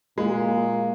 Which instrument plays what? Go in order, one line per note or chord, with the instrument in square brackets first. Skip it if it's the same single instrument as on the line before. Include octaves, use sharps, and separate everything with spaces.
[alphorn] A#2 [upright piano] G#3